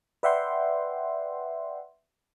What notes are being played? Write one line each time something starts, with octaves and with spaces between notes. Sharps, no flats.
B4 D5 E5 F#5 G5 C6